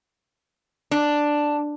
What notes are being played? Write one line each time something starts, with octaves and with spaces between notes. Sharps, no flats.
D4